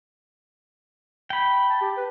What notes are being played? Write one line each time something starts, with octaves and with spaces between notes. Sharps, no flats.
G5 B5
A5
G4
B4